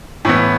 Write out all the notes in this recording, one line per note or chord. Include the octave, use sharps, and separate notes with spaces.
A2 E3 B3